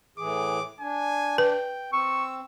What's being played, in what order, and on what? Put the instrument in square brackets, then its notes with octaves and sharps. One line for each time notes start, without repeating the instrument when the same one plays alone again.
[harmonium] A2 E3 G#4 [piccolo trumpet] D6
[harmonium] D4 [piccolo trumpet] G#5
[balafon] B4 [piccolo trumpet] G5
[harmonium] C4 [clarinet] C#6 [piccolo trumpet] E6